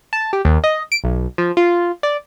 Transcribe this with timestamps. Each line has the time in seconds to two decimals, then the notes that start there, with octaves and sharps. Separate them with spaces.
0.13 A5
0.33 G4
0.45 D#2
0.64 D#5
0.92 D7
1.04 B1
1.38 F3
1.57 F4
2.03 D5